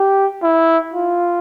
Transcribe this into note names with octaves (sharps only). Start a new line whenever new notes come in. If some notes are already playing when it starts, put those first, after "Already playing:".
Already playing: G4
E4
F4